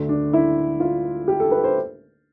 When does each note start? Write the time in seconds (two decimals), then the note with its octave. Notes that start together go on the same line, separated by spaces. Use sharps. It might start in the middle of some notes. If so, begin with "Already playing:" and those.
Already playing: D2 D3 A3
0.09 D4
0.33 E4
0.80 F4
1.28 G4
1.40 A4
1.51 B4
1.64 C5